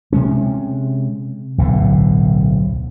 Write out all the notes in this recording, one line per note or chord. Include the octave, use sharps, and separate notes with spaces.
C3 G#3 C#4
D1 B1 A2 D3